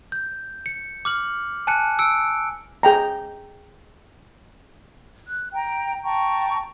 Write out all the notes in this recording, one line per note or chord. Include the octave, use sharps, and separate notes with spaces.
G6
C#7
D6 F6 F#7
G#5 A5 F#6 C#7
E6 C#7 D7
G#4 G5 A#5
F#6
G5 A#5
G5 A5 A#5 C#6